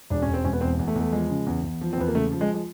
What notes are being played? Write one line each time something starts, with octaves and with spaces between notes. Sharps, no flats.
E1 D4
C#4
E1
C4
E1 C#4
B3
E2 C4
E2
A3
E2
A3
F3 G#3
C#3
E2
E2
F3
C4
E2 B3
A#3
C#3 A3
F3
G#3
G#3